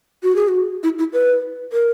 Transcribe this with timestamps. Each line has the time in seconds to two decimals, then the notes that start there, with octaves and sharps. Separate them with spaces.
0.23 F#4
0.36 G#4
0.48 F#4
0.83 E4
0.99 E4
1.13 B4
1.73 A#4